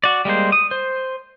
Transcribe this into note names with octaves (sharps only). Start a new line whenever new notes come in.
F#4 D5
G3 G#3 A#3 C5
D#6
C5